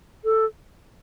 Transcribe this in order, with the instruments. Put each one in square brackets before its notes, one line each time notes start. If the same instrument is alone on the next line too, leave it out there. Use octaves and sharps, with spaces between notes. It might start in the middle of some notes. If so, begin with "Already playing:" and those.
[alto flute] A4